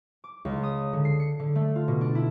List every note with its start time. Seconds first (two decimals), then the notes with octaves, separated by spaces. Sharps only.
0.24 D6
0.45 C#2
0.63 D#6
0.93 D3
1.05 C7
1.20 C#7
1.39 D3
1.55 A3
1.75 F4
1.88 B2
2.01 D4
2.15 E4